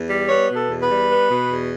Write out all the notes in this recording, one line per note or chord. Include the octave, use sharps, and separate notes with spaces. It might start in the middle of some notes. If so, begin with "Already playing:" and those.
Already playing: E2
G3
B3 C#5
B2
A4
E2
B4
G3
B3
B2
E2